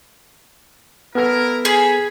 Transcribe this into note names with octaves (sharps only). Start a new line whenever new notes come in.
B3 E4 A4 A#4
G#4 C5 C#5 B5